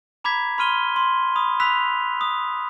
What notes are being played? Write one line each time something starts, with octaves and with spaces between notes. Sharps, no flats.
A#5 B5 D6 G#6 B6
B5 C6 F6 D#7 G7
C6
B5 D#6
B5 E6 F#6 B6 F7
D#6